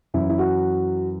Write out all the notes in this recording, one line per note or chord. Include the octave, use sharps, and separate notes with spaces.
F#2 E3 E4
E4
F#4